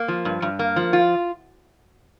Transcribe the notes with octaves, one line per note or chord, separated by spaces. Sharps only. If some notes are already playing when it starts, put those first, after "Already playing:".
Already playing: A#3
F3
G2
G2
A#3
F3
F4